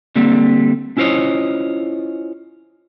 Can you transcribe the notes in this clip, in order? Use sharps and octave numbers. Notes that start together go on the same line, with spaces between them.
D3 G3 A#3 C4
C#4 E4 F4 C5 C#5 D#5